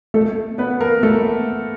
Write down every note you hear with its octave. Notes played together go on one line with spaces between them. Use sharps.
A3 A4
B3 B4
A#3 A#4
A3 A4